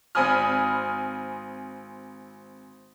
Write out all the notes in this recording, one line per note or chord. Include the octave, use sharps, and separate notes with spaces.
G#1 C4 G#5 B5 D#6 F6